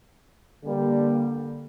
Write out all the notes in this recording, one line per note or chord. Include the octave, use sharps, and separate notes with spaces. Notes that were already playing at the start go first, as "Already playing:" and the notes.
D3 G3 A#3